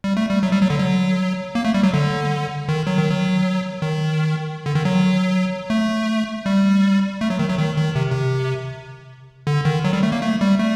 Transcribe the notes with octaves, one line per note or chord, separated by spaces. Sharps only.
G3
A3
G3
F#3
G3
F#3
D3
F#3
A#3
A3
G3
F#3
D3
D#3
F#3
D#3
F#3
D#3
D3
D#3
F#3
A3
G3
A3
F#3
D#3
F#3
D#3
D#3
C3
C3
D3
D#3
F#3
G3
A3
A#3
A3
G3
A3